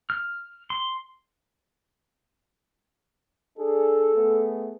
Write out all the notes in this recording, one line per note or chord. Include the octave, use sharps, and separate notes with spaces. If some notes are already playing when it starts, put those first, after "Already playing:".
F6
C6
D4 G#4 A4
A3 B3 G#4